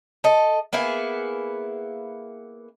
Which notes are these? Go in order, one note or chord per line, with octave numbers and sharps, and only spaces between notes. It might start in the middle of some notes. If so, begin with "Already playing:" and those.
A4 D#5
A#3 B3 E4 G#4